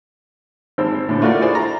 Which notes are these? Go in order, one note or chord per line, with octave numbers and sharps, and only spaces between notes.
G#1 C5 E6
A2 D3
A3 F4 F#4 A#4 D5
E4 G#4 C5 D5 E5
A#5